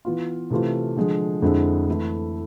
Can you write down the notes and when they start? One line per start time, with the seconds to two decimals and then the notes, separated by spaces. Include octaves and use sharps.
0.05 E3 B3 F4
0.50 C3 E3 A3 C4 F4
0.97 D3 F3 G#3
1.42 F2 D3 G#3 C4 E4
1.88 E3 A3 E4